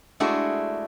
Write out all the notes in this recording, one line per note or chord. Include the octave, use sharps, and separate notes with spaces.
G#3 A3 D4 E4 F#4 G#4